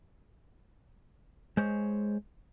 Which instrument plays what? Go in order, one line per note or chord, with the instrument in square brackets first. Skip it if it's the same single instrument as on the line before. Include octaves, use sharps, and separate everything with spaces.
[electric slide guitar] G#3 C5 C#5